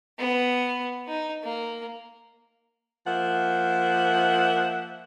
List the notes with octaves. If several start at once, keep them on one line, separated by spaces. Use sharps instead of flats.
B3
D#4
A#3
F3 A#3 E5 F#5